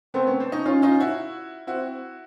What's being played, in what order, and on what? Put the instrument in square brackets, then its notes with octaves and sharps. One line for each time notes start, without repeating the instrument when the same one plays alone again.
[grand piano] A3 B3 [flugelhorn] C4
[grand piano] B3 C#4
C4 D4
C#4 D#4
[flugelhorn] C#4 [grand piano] D#4 F4
[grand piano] D#4 F4
E4 F#4
[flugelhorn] C4 [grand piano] E4 F#4